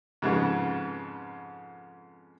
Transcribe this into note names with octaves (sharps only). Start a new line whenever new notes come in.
F2 G#2 C#3 B3